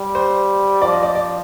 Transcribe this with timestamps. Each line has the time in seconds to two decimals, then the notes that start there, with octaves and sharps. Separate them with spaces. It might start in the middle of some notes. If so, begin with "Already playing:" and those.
Already playing: G3
0.15 C5
0.82 F3 D5
0.93 D#5
1.03 D5
1.15 D5